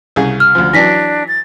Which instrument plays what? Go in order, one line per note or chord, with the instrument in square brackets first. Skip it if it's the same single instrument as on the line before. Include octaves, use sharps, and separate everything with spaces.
[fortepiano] C2 C#3 G#4
[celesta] F6
[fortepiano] D2 F3
[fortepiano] E3 F#3 [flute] D4 [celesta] A#6 B6
[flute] A6